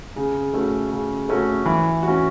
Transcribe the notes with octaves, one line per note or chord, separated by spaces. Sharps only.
C#3
A3 C#4 F#4
C#3
A3 C#4 F#4
E3
C#4 F#4